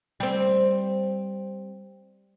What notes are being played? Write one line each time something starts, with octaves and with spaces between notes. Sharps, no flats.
G3 C4